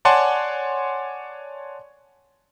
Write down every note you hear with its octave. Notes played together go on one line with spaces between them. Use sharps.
C#5 D5 F#5 G#5 A5 C6